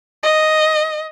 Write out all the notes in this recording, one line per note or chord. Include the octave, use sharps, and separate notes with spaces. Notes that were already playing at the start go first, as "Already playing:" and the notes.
D#5